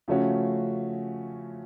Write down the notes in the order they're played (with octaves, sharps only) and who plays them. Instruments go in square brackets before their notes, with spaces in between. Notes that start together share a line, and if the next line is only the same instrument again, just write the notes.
[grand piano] C#3 F3 A3 C#4 F#4